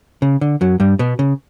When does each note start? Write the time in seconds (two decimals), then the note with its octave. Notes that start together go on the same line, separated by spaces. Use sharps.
0.22 C#3
0.41 D3
0.61 F#2 F#3
0.80 G2 G3
0.99 B2 B3
1.19 C#3